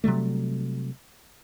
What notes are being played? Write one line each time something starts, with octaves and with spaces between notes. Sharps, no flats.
C3 F#3 G3 A3